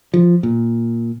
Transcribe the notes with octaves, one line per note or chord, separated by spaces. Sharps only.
F3
A#2